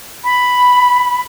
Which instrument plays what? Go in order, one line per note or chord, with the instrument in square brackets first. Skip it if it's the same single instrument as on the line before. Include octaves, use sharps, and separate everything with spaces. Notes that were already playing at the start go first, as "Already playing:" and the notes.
[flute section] B5